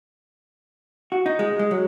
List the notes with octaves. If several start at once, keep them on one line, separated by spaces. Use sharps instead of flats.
F#4
D#4
G#3
G#3
F#3